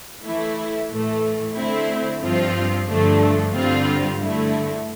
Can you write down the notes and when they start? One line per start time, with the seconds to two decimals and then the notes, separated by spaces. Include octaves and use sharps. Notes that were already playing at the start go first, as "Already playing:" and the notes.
0.24 E3 A3 E4
0.90 A2 E3 A3
1.56 D3 A3 C4 E4
2.22 G2 F3 C4 F4
2.88 G2 D3 F3 A3 D4
3.53 G2 D3 G3 C4 F4
4.19 G2 D3 A3 E4